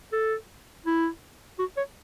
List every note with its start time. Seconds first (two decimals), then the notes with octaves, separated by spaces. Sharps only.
0.12 A4
0.86 E4
1.59 F#4
1.77 C#5